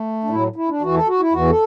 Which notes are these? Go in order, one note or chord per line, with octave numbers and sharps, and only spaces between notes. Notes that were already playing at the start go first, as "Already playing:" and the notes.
Already playing: A3
D4
A2 F#3 E4
E4
D4
E2 E3 F#4
A4
F#4
E4
E2 E3 F#4
A4